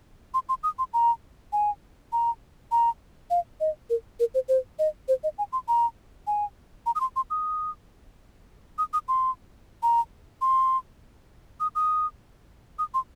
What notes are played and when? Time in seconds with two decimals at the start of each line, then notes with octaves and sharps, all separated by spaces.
0.34 C6
0.49 C6
0.63 D#6
0.79 C6
0.94 A#5
1.53 G#5
2.12 A#5
2.72 A#5
3.30 F5
3.60 D#5
3.90 A#4
4.20 A#4
4.34 C5
4.49 C5
4.79 D#5
5.08 C5
5.24 D#5
5.38 G#5
5.53 C6
5.68 A#5
6.27 G#5
6.86 A#5
6.95 D#6
7.01 C6
7.16 C6
7.30 D#6
8.78 D#6
8.93 D#6
9.08 C6
9.83 A#5
10.42 C6
11.60 D#6
11.75 D#6
12.79 D#6
12.94 C6